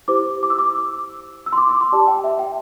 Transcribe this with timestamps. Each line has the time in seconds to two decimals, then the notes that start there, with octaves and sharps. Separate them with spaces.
0.08 E4 G4 C5 D6
0.43 D6
0.50 E6
0.58 D6
1.46 E6
1.52 C6
1.58 D6
1.69 D6
1.81 C6
1.92 G4 D5 A5
2.08 G5
2.24 E5
2.39 G5